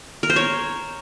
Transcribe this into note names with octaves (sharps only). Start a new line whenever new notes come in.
A#4
C5
C#5